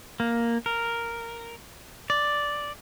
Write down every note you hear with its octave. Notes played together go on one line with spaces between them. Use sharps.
A#3
A#4
D5